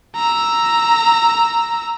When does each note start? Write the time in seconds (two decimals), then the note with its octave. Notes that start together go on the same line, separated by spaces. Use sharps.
0.15 A#5 E6